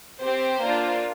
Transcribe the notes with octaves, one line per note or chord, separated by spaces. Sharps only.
C4 G4 C5
A#3 D4 F4